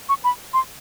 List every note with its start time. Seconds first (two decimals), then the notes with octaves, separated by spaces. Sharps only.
0.09 C#6
0.24 B5
0.53 C6